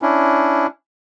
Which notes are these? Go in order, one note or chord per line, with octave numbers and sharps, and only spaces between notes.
C#4 D4 E4